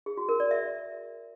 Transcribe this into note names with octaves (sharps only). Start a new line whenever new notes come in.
G#4
F#4
A#4
D5
E5